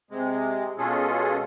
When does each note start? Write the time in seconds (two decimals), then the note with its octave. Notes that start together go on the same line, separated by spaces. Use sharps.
0.11 C3 G#3
0.78 B2 G#3 C#4 F4 G#4 A4